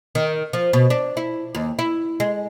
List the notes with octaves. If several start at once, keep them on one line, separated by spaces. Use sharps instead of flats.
D#3
F3
B2
D4
E4
D#2
E4
G#3